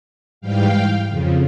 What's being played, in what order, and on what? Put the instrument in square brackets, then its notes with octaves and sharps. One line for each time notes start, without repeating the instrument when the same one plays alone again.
[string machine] G#2 E3 G3 F5 G5
F2 C#3 F3